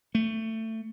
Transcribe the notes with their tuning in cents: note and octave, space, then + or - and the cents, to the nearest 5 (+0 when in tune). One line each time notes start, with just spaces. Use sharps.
A3 +20